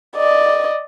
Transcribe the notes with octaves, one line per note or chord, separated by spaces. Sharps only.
D5 D#5